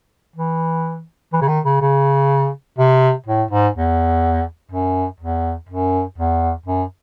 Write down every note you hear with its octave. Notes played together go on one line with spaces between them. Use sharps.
E3
E3
C#3
D#3
C#3
C#3
C3
A2
G#2
E2
F#2
E2
F#2
E2
F#2